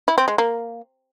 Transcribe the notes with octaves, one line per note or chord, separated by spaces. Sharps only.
E4
C4
G#3
A#3